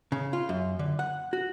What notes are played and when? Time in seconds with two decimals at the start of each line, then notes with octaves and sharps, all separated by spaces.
0.12 C#3
0.33 F4
0.49 F#2
0.79 D3
0.99 F#5
1.33 F#4